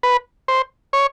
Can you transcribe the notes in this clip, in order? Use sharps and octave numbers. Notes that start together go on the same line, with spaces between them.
B4
C5
C#5